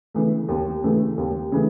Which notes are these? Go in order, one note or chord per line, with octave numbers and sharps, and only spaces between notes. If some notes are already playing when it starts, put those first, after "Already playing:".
C#3 E3 A3
D#2
C#3 E3 A3
D#2
C#3 E3 A3